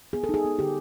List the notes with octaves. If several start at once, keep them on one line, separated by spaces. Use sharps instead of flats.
B3 G#4
A4
D#4 G#4
B3
D3 G4